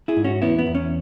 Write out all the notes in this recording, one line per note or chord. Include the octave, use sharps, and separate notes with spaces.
E4 G#4
G#2
C#4 F#4
E2 B3 E4
B3
E2
C#4